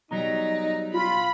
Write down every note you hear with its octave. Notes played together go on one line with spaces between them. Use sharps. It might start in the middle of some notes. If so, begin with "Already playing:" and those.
B2 F#3 G3 D#4 A#5
F4 B5